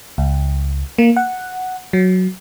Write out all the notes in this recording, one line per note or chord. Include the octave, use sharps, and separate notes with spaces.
C#2
A#3
F#5
F#3